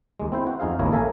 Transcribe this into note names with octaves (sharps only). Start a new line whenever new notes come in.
D#2 G#3
C4 E4 C5
F#4
F2 D#4 G#4 F5
A1 D#2 A#3 E4 A#4 C#5
A4 A#4 E5 F5 G#5 A#5